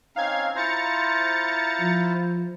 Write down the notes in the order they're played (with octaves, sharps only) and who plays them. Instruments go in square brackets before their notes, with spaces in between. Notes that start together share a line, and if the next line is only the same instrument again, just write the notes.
[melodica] C4 C#4 D#4 [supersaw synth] F5 G#6
[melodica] E4 F4 C5 [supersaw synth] A#5 A6 C#7
[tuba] F3